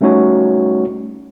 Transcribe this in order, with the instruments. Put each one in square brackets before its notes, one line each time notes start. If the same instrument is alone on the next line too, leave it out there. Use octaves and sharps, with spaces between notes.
[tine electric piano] G3 A3 C#4 D#4 F#4 C#5